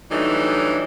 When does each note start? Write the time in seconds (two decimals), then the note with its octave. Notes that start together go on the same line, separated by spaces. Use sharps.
0.11 E3 F#3 G3 A3 D4 D#4